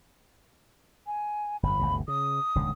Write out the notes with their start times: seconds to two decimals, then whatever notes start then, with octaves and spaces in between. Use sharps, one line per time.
1.06 G#5
1.63 G1 F2 B5
1.79 G1 D2 C3
2.08 C#3 D#6
2.55 D#1 C#2 D3